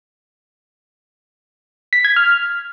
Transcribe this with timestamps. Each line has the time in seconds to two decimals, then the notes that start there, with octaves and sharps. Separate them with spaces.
1.93 B6
2.05 G#6
2.16 F6